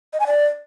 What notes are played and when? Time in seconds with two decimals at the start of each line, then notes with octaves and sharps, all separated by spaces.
0.13 D#5
0.20 G#5
0.27 D5